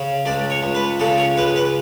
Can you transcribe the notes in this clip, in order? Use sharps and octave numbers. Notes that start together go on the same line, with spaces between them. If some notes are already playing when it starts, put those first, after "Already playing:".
Already playing: C#3
C#2 D5
C#5
C#2
B4
C#3 A4
C#5
C#2 B4
B4